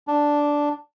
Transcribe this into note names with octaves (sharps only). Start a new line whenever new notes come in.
D4